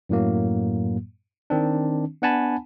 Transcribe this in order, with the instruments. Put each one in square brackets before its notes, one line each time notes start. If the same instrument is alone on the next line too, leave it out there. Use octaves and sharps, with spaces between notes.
[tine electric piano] F#2 A2 F#3 A#3
D#3 C4 D4
B3 D4 F#5 G#5 A5 B5